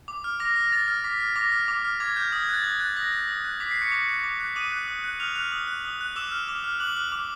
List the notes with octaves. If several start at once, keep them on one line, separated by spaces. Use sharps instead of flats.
D6
F6
D6 A#6
F6 A#6
D6 A6
F6
D6 B6
F6
D6 A#6
F6
D6
F6
D6 G#6
F6 G6
D#6 G6
G#6
F#6 A6
D#6 G#6
F#6 A6
D#6 A#6
F#6
D#6
F#6
D6 B6
C7
F#6
C#6 C#7
D6
F#6
D6
F#6
D6 D#6 D#7
F#6
D#6
F#6
D#6 F6 F7
F6 F#6 F7
D#6
F#6
D#6
F#6
D6 E6 E7
F6
D6
F6
D6 F#6 F#7
F6
D6